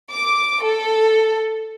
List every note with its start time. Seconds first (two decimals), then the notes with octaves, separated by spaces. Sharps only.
0.10 D6
0.63 A4